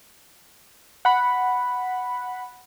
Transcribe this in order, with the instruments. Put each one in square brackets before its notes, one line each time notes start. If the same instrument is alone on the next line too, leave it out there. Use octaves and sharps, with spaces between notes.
[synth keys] F#5 B5